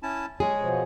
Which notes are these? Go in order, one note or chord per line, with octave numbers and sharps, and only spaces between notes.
C#4 E4 A5
G#3 G#4 C#5
B2 F3